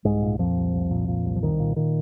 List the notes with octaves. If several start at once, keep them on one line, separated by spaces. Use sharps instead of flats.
C2 G#2 G#3
A#2
F2 A#2 F3
C2
C2
A#2
A#2
C2
F3
C2 D#3
A#2
A#2 D#3